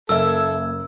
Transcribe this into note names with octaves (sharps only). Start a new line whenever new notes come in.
F#1 A#3 A4 E5 G#5 E6